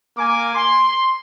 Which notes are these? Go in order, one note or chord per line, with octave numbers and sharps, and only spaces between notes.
A#3 G#5 D6
C6